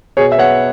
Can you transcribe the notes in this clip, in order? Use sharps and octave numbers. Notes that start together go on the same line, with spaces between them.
B2 G#4 C#5
E5
B3 C#5 F#5